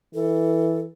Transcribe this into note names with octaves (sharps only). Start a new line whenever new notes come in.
E3 A4